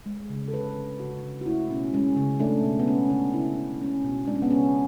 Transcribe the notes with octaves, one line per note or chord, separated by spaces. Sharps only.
G#3
C#3
A4
D3 B4
D3
C#3 F#4
C#3
F#4
A3 E4
B2 C#4
G#3 C#4
C#3
A3 D4
B2
B3
G#3 C#4
D3 D4
C#3 E4
C#3 D4
G#3 C#4
B2
G#3 D4
C#4
B3
C#3 C#4